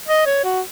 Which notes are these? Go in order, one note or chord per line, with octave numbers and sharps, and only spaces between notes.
D#5
C#5
F#4